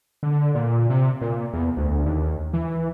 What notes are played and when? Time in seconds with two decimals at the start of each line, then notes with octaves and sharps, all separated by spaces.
0.23 D3
0.55 A#2
0.90 C3
1.22 A#2
1.53 E2
1.77 D2
2.06 D#2
2.53 E3